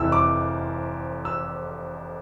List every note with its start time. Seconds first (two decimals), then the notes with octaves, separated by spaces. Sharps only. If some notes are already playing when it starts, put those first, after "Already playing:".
Already playing: F1 F2 E3 E6
0.12 D6
1.25 E6